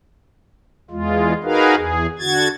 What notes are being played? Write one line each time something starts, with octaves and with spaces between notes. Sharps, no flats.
E2 G#3 F4
D#4 F#4 G#4 A#4 B4 F5
E2 G#4
D3 F#4 G#6 A6